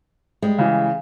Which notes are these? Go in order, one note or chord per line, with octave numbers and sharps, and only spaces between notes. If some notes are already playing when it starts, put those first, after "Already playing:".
G3 G#3
C#3 E3